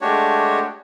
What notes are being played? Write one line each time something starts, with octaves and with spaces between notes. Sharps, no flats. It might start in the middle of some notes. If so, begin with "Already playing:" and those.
G#3 A3 D4 F#4 G4 C#5